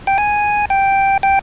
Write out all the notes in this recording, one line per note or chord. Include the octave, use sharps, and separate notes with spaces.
G5
G#5
G5
G5